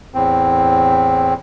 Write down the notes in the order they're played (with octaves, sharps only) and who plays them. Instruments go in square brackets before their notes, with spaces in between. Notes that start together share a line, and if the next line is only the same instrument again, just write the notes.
[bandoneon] E2 A2 C4